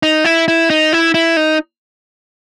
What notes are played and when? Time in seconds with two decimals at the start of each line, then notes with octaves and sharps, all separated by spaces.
0.03 D#4
0.24 E4
0.48 E4
0.70 D#4
0.93 E4
1.14 E4
1.37 D#4